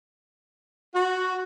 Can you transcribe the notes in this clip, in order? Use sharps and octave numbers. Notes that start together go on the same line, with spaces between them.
F#4